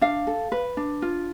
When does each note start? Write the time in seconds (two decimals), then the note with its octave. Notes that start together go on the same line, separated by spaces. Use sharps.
0.01 D4 F5
0.27 A4
0.52 B4
0.77 D4
1.02 F4